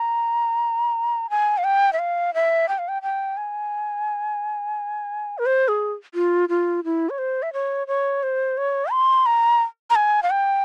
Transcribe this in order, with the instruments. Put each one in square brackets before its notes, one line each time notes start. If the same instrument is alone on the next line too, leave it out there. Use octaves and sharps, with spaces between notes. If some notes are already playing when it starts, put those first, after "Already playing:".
Already playing: [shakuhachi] A#5
G#5
F5
G5
E5
F5
E5
G5
F5
G5
G5
G#5
A#4
C5
G#4
F4
F4
E4
C#5
C5
E5
C#5
C#5
C5
C#5
C6
A#5
A#5
G#5
F5
G5